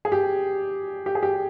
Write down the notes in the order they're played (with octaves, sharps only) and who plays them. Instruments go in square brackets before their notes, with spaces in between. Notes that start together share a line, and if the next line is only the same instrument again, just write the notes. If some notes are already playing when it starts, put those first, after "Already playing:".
[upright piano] G#4
G4
G4
G#4
G4